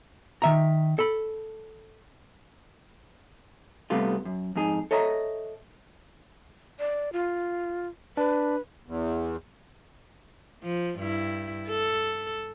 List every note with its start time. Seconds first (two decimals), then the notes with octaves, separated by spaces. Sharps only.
0.42 D#3 E5 A#5
0.99 A4 B5
3.90 C3 G3 A3 B3 F4
4.25 F#2
4.56 F2 G#2 D#4 G#4
4.91 A4 C#5 D#5 E5 A#5
6.79 D5
7.13 F4
8.17 D4 B4
8.87 E2
10.63 F3
10.99 G2 E4
11.68 A4